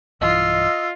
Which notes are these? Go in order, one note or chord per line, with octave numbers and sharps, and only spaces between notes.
B1 G2 E3 F4 D#5 E6